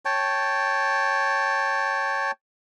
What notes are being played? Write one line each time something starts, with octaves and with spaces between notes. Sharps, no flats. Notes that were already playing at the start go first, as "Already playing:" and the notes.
C#5 G5 A5